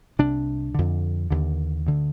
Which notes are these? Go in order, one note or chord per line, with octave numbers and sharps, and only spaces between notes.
C2 C3 D4
F2 D3
D#2 D3
D2 D3